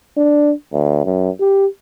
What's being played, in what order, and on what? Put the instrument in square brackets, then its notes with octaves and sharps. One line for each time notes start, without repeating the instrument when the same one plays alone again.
[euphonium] D4
D2
F#2
G4